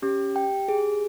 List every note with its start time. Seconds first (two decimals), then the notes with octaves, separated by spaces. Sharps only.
0.02 C#4 G4
0.36 G5
0.68 G#4